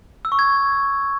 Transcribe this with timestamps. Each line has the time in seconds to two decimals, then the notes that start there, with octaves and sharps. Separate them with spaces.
0.25 E6
0.32 C#6
0.39 G#6